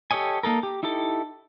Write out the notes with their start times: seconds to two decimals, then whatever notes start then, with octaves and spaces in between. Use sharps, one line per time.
0.11 G4 A4 C#5 D#5 G#5
0.43 A#3 D#4 A4 A#4
0.63 G4
0.83 D#4 E4 G4 A4